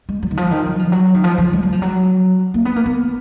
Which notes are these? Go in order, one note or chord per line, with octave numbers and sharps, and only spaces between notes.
G#3
F#3
D#3
F3
D#3
F#3
F3
F#3
D#3
F3
F3
G#3
F#3
F3
F#3
A#3
B3
A#3
B3